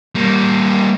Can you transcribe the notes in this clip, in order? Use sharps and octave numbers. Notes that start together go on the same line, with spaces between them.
G3 A#3